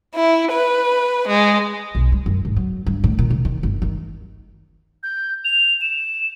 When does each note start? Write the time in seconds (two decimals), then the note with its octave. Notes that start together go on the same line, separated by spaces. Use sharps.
0.15 E4
0.52 B4
1.28 G#3
1.95 B1
2.12 G3
2.26 F#2
2.45 G#2
2.56 F#3
2.87 G2
3.04 A2
3.19 A#2
3.30 C3
3.45 D#3
3.63 G1
3.82 D#3
5.03 G6
5.45 F7
5.81 E7